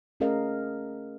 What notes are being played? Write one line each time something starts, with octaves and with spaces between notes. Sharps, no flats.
A3 C#4 G#4 A#4 D#5 F5